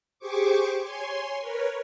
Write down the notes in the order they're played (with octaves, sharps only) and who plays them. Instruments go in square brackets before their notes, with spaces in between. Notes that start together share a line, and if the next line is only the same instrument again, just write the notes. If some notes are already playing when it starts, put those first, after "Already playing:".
[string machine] G4 G#4 C5 C#6 D6
C#5 G#5 C6
A#4 B4 C#5